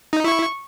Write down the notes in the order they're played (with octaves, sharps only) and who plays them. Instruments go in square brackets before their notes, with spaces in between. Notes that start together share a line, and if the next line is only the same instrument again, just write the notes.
[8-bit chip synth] D#4
[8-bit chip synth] E4 [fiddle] C#6